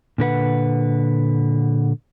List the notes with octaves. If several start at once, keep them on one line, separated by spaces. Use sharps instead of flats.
A#2 D3 B4 F#5